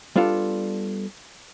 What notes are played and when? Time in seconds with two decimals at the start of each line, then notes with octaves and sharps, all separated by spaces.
0.16 G3 B3 D4 F4 A4